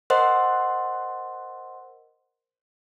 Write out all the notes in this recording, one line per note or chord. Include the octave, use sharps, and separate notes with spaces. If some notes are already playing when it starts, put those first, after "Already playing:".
A#4 C5 D#5 F#5 C6